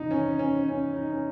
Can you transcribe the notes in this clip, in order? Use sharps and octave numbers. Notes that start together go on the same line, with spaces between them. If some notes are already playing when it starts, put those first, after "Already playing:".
Already playing: E2 C3 D#3 D#4
C#4
C#4
C#4
D#4
C#4